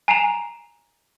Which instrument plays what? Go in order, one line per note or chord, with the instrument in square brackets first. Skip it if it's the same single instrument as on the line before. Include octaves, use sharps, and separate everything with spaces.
[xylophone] G#5 A#5 C7 D7 E7 F7